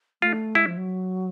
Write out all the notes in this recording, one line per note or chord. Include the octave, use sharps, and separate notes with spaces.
A3 F4
G#3 E4
F3
F#3